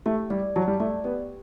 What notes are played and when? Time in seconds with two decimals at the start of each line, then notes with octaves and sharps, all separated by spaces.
0.06 A3 G4
0.30 G3 D5
0.56 F#3 A5
0.68 G3
0.80 A3 D5
1.04 B3 G4